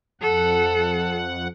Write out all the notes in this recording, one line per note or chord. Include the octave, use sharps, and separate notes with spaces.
F2 A4 F#5